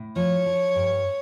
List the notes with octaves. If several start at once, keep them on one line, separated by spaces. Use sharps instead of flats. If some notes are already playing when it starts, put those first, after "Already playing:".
Already playing: A2
F3 C#5
F3
G2